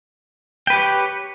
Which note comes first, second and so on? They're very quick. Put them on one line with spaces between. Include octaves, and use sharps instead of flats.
G5 B4 G4 C#5